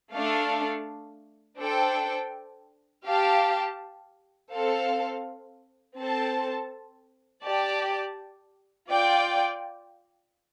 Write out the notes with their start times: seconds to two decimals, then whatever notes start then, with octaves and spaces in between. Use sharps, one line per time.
0.12 A3 D4 A4 F5
1.59 D4 A4 C5 G5
3.05 G4 F5 A5
4.51 C4 A4 F5
5.97 C4 A4 C5 A5
7.43 G4 D5 A5
8.89 F4 D5 G5